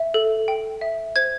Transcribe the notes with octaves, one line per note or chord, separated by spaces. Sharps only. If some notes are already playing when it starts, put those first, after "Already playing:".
Already playing: E5
A4
G5
E5
C5 G#6